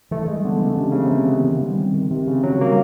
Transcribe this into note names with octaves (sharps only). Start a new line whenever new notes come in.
E3 A3
G3 G#3
D3 B3
C#3 E3
C3 D4
C#3 B3
C3
E3
B3
D#3
G3
C4
D#3
C3 D#3
C#3 C4
D#3 F#3
G3 A#3